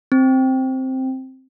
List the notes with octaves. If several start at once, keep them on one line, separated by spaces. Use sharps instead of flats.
C4